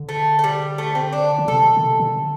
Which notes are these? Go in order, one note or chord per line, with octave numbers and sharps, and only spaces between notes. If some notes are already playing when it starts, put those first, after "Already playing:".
Already playing: D3
A3
A3
G3
A3
C4
D4
D3
C3 A4
D3
C3
D3